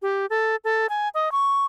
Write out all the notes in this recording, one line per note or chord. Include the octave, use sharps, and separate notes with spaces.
G4
A4
A4
G#5
D#5
C#6